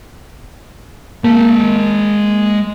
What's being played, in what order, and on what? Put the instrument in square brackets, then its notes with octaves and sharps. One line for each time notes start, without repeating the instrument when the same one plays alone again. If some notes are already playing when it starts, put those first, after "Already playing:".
[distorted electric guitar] G#3 A5 [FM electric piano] A#3